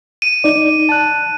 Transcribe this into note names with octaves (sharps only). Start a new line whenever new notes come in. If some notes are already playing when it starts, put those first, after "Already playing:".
D#7
D#4 D5
A5 F#6